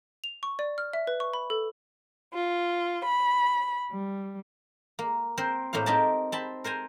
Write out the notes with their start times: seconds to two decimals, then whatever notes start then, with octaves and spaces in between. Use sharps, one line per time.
0.24 F7
0.43 C#6
0.59 D5
0.78 F6
0.93 E5
1.07 B4
1.20 C#6
1.34 B5
1.50 A4
2.33 F4
3.04 B5
3.90 G3
4.99 A#3
5.38 C4 A#4 C5
5.73 A2 A#3 C5 F5
5.86 C4 D#4 G4 A#4 A5
6.32 C4 A5 B5
6.64 A#4 C5 G#5 A#5